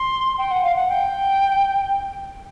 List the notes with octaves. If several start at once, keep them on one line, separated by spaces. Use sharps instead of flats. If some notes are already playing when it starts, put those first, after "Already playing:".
Already playing: C6
G5
F#5
F5
F#5
G5